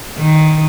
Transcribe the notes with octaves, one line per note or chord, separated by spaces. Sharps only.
D#3